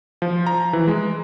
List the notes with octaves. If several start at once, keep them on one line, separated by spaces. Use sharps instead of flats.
F3
A#5
E3
G#3